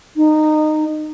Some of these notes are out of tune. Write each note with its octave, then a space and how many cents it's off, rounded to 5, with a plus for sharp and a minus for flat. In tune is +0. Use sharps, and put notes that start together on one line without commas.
D#4 -20